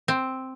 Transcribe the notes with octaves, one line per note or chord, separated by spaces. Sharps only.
C4